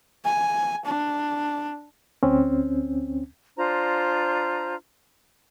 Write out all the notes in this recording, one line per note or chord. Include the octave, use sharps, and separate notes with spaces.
G#5
D4
D2 C4 C#4
D4 F4 C5 A#5